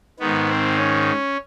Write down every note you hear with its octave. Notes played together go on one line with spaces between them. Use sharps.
G#2 D#3 B3
C4
C#4